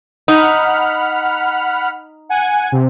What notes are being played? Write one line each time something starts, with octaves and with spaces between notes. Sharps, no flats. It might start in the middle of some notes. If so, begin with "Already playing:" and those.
D#4 F#5 B5 F6
F#5 G#5
C3